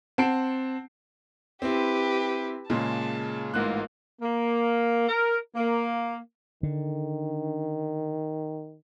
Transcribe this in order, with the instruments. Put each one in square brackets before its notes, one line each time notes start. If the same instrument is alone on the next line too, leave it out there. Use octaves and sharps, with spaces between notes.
[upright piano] C4 F#5 A5 C7 D7
[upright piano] C4 E4 [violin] G4 B4
[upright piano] A#2 C#3 G#3 [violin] A5
[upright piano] A1 G#2 F#6 [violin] A#3 F4
[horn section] A#3
A#4
A#3
[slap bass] D3 [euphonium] D#3